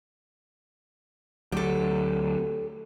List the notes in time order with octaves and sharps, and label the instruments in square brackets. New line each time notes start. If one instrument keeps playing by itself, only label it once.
[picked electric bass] D2 F#3 [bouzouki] G4 A4